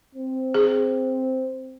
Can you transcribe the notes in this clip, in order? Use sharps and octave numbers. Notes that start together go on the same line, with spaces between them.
C4
G#4